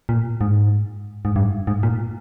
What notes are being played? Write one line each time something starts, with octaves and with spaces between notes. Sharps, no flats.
A#2
G#2
G#2
G2
G#2
A#2